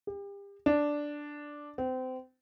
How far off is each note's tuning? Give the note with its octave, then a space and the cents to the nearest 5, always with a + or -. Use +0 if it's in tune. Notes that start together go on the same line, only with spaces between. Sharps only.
G4 +35
D4 +0
C4 -30